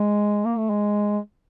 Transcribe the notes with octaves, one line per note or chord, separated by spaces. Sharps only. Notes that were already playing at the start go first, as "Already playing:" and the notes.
Already playing: G#3
A#3
A3
G#3